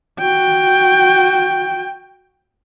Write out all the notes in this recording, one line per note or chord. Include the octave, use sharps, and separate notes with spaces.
F#4 G5